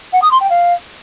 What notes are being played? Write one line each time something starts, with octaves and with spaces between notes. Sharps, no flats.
F#5
D#6
C6
G5
F5